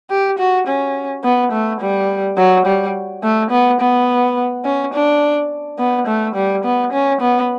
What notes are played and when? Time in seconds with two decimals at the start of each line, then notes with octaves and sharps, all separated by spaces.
0.10 G4
0.39 F#4
0.67 C#4
1.24 B3
1.52 A3
1.81 G3
2.37 F#3
2.66 G3
3.23 A3
3.51 B3
3.81 B3
4.65 C#4
4.94 D4
5.79 B3
6.07 A3
6.35 G3
6.64 B3
6.92 C#4
7.21 B3